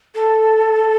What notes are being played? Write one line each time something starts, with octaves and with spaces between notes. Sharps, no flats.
A4